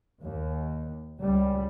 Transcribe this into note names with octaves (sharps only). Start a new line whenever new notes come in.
D#2
C#2 G3